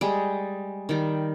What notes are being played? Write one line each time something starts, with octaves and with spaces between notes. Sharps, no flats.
G3 G#3
D#3 G3